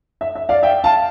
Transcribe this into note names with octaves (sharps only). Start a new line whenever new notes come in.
E5
E5
D5 F5
E5 G5
F5 A5